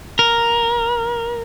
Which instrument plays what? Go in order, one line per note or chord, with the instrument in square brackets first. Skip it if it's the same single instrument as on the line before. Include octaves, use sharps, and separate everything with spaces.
[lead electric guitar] A#4